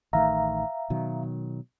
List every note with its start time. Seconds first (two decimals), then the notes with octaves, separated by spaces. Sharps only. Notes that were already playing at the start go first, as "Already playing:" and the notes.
0.13 A1 D#3 A3 E5 F5 A#5
0.90 B2 D#3 F#3